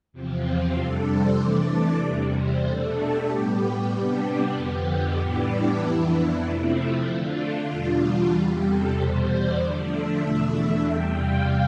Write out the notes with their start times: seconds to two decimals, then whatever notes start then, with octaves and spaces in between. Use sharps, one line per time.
0.12 E2 C3 F3 C4
0.45 F4
0.76 F2 C3 G3 D4 A4
1.08 C5
1.39 C3 E3 A3 D4 D5
2.02 E2 C3 G3
2.34 C5
2.65 B2 A3 D4 A4
2.97 G4
3.29 A2 G3 B3 G4
3.60 G4
3.91 C3 G3 B3 D4
4.54 F2 D3 F3 B3 G4
5.17 A2 E3 G3 B3 D4 G4
5.49 E4
5.80 F2 E3 B3 D4
6.43 C3 F3 A3 C4
7.07 D3 A3 D4 F4
7.70 E2 B2 G3 D4
8.32 E2 C3 G3 G4
8.65 A4
8.96 E2 B2 G3 C5
9.28 D5
9.58 D3 F3 A3 D4
9.91 E5
10.21 E2 B2 A3 D4 E5
10.85 E2 C3 G3 G5
11.17 F5